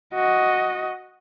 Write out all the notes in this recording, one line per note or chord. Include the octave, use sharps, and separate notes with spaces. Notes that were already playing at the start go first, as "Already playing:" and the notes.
F#4 D#5